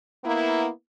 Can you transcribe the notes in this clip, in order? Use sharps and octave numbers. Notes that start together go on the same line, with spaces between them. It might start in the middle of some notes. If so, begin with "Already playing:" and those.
A#3 B3 E4